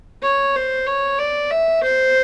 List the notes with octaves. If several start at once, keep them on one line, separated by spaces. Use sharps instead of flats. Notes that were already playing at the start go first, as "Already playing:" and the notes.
C#5
C5
C#5
D5
E5
C5